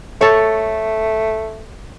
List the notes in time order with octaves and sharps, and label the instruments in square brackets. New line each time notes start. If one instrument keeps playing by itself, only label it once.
[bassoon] A3 [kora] A4 C#5